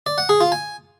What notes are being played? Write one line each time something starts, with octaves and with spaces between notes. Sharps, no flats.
D5
F#5
G#4
F4
G#5